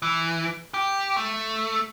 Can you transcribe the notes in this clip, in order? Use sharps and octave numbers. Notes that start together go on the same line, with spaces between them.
E3
G4
A3